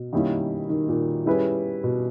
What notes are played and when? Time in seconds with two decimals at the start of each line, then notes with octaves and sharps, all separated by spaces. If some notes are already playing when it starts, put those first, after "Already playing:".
Already playing: B2
0.13 D#3 G3 A#3 C#4 E4
0.69 D#3
0.89 A#2
1.26 G3 C#4 E4 G#4 B4
1.84 B2